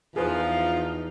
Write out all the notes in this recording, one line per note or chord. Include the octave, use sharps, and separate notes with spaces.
E2 F3 D#4 F4 G#4 B4 C5